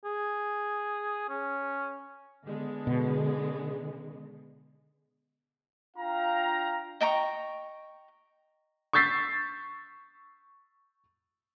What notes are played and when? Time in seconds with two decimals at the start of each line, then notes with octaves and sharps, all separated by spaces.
0.05 G#4
1.30 C#4
2.45 D3 G#3 B3
2.87 B2
5.97 D4 F4 F5 G5 A#5
7.01 D#5 G5 A#5 C#6
8.93 C#6 E6 G6 A6 B6 C7